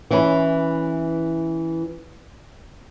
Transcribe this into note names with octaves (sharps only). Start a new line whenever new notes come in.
E3 C#4 E4